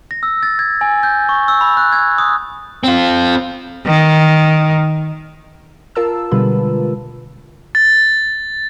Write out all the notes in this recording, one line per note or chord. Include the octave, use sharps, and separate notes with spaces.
A#6
E6
A6
G#6
G#5
G6
C#6
E6
B5
F#6
G#6
D#6
C4 F4
D#3
F4 A#4 A5 E6
B2 D3 G3 G#3 F4 B4
A6